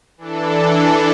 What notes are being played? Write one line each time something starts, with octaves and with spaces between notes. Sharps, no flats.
E3 D4 A4